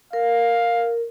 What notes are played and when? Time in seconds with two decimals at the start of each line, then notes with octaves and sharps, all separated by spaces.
0.13 A#4 F5